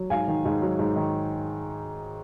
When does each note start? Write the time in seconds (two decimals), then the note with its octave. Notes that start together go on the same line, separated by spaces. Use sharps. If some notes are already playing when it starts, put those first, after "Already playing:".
Already playing: F#3
0.10 G#2 F5 G#5
0.28 D#3
0.45 G#2
0.62 F#3
0.79 G#2
0.96 D#3